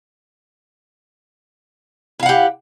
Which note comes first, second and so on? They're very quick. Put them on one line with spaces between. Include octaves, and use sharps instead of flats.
E4 F5 F#5 G4